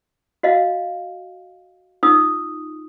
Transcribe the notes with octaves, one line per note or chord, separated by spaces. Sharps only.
F#4 D#5 F5
D#4 F4 D#6 E6